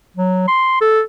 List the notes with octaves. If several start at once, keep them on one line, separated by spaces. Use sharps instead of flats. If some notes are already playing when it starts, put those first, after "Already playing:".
F#3
C6
A4